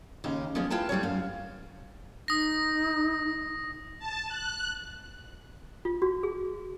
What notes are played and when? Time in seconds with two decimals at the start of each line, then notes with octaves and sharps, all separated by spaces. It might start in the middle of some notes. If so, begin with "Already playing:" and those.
0.24 D#2 C#3 D#4 G4
0.55 F3 G#3 B3 C#4
0.70 E4 F4 B4 G5 A5
0.89 D2 G3 C4 C#5
1.03 F#2 F5
2.28 D#4 D#6 A#6
3.99 A5
4.28 F#6
5.85 F4
6.02 F#4
6.23 G#4